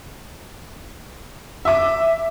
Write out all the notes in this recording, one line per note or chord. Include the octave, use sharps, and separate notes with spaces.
E5 D6